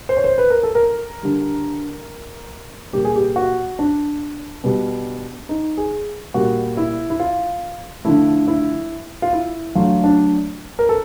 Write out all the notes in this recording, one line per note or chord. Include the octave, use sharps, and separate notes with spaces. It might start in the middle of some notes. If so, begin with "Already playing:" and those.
C5
C#5
C5
B4
A#4
A4
A#4
D3 G3
A#2 G3 G4
G#4
G4
F#4
D4
B2 G3
D#4
G#4
A#2 G3 F#4
E4
E4
F4
D3 F3 A3 E4
E4
F4
E4
D3 F#3 A3 F4
D4
A#4
A4